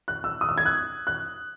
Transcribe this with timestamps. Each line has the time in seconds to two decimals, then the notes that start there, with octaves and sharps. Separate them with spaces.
0.08 F#6
0.24 E6
0.41 D#6
0.49 E6
0.58 G#6
0.66 F#6
1.07 F#6